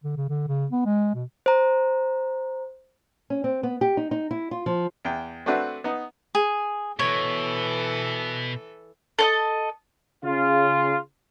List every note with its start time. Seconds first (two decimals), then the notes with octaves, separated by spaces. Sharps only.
0.04 D3
0.17 C#3
0.30 D3
0.48 C#3
0.72 B3
0.86 G#3
1.15 B2
1.46 C5 A#5
3.30 C#4
3.44 C4
3.63 B3
3.81 G4
3.97 D#4
4.11 D#4
4.31 E4
4.51 F4
4.66 F3
5.05 E2 G5
5.46 A3 C4 D4 F#4 B4
5.84 B3 D#4
6.35 G#4
6.99 B2 E3 A4 C#5
9.19 A4 C#5 D#5
10.24 C#3 F4